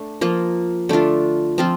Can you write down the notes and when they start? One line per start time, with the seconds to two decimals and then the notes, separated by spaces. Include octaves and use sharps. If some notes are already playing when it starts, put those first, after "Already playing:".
Already playing: A3 D4
0.21 F3 A#3 F4
0.89 D3 A3 D4 F4
1.58 F3 C4 F4